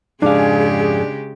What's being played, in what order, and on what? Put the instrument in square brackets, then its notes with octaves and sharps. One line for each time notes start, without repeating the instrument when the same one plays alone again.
[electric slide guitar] F2 G#2 F5 [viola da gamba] C#3 G#3 G4 [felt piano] D4 [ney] G#4